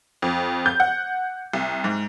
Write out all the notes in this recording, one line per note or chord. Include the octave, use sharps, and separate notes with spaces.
F2
G6
F#5
C2
G#2